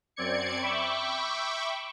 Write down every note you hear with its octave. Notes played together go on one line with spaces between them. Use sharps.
F#2 C4 D5 G#6 C#7
E5 G5 B5 C#6 D6